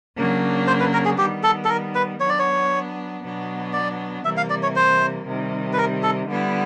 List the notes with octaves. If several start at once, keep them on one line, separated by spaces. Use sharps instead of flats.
C#3 F#3 A#3 D4
C5
B4
A#4
G#4
D#3 G3 B3 G4
A4
A4
A#4
B4
F#3 B3 D4 C#5
D5
C#5
B2 F#3 B3 D4
D5
C3 E3 G3 A#3 E5
F5
D5
C#5
C5
C3 D#3 G3
B4
A#4
A4
D3 G3 B3 E4